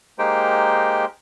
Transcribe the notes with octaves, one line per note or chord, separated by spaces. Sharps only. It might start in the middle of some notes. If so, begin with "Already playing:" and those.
G#3 A#3 D#4 G4 C5 G5